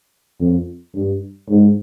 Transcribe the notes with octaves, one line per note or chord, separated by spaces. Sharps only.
F2
G2
G#2